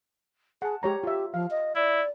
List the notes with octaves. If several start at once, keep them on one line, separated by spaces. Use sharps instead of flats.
G#4 F#5 A5
G#3 G4 C#5 A#5
F4 G4 E5
F3 F5
D#5
E4 D5